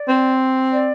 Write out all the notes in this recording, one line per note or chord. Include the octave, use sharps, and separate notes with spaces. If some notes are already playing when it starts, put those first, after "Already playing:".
Already playing: D5
C4
D5